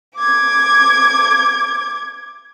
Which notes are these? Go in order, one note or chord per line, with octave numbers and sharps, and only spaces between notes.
D6 G#6